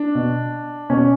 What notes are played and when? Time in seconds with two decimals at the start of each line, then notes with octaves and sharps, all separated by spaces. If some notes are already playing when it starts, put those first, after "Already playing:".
Already playing: D4
0.15 B2
0.90 B2 C#4